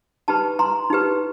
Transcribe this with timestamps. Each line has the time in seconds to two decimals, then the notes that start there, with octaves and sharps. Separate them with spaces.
0.28 D#4 G4 B4 A5 B5
0.59 A#5 C6
0.90 D#4 G4 B4